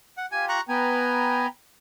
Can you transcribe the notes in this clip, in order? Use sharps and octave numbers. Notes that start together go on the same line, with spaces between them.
F#5
F4 G4 G#5
A#5 C#6 F#6
B3 B4 G5 G#5 A#5